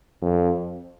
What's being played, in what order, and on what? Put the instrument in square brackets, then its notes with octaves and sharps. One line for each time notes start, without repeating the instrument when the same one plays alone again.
[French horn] F2